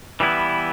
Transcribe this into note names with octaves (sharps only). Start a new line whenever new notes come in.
E3 G3 B3 E4